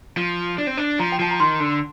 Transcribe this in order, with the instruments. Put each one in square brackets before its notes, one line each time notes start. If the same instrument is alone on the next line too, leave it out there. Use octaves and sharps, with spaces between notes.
[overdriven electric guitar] F3
D4
C4
D4
[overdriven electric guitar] F3 [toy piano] A#5
[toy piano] G5
[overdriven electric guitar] F3 [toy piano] A5
[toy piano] A#5
[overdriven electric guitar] D#3 [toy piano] C6
[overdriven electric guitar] D3